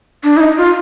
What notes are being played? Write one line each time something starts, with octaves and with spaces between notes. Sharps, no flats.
D4
E4
D#4
F4